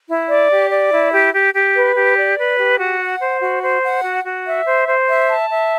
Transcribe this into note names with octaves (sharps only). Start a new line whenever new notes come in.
E4
D5
G4
D5
E4
G4
G4
G4
B4
G4
D5
B4
G4
F#4
F#5
C5
F#4
C5
F#5
F#4
F#4
E5
C5
C5
E5
A5
E5